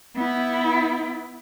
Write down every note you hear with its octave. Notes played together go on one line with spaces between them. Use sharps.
B3 E4